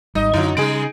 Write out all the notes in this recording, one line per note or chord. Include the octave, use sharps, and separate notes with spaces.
G#1 G3 D#4 D#5
F#2 D3 F#3 D#4 E4
C#3 G3 G#3 D#4 G#4 D7